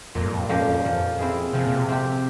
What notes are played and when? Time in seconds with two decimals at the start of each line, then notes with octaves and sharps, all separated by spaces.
0.15 F2 A#2
0.25 G2
0.34 F2
0.43 G2
0.49 F2 F3 A#3 C#4 G4
0.61 G2
0.70 F2
0.79 G2
0.85 F2 F3
1.18 C4 E4 G#4
1.53 C3 F3
1.65 A#2
1.77 C3
1.89 C4 G4